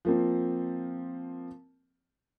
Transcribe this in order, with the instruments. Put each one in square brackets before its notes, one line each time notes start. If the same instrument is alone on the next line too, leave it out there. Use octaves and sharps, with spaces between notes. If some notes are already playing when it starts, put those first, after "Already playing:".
[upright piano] F3 A#3 C4